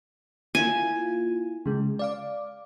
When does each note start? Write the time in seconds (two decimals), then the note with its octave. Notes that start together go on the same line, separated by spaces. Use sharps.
0.55 A#3 E4 F4 G#5
1.66 C#3 G#3
1.99 D5 F5 D6